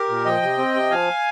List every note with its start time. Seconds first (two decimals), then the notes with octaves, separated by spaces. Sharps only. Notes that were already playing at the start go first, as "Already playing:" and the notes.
Already playing: G4 A#4
0.09 A#2
0.25 F3 D#5 G5
0.42 C3
0.58 C4
0.74 C3
0.91 F3 F5 G#5